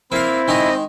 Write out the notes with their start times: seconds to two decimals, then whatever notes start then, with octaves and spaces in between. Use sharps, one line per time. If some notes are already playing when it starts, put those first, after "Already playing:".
0.12 A#3 C4 E4 F5
0.48 D#3 G#3 D#4 D#5